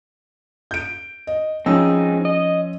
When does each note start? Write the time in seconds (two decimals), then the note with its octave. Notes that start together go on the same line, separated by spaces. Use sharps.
0.71 G6 D7
1.27 D#5
1.66 F3 C4 C#4 D#4 G#4 E6
2.25 D#5